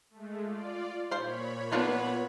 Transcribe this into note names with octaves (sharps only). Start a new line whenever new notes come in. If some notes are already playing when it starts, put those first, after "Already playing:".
G#3 A3
F4 D5
A#2 C5 C#5 F5 B5
B3 D4 F4 F#4